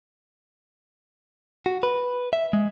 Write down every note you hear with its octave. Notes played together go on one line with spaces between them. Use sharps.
F#4
B4
E5
G#3